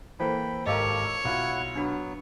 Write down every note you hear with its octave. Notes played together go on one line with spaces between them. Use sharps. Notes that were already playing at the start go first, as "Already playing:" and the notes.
E3 A#3 A4 C5 G5 B5
G#1 G4 A4 A#4 C#5 D#5 F5 A5
B1 E4 F4 F#5
F#3 B3 D4 F#4